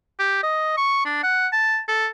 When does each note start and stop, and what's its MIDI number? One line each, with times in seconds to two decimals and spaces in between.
0.19 0.39 67
0.43 0.75 75
0.77 1.01 85
1.05 1.22 62
1.23 1.47 78
1.53 1.79 81
1.88 2.07 69